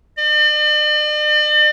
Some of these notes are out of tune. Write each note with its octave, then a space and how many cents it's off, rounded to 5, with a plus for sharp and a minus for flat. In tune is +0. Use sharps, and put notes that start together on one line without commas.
D5 +45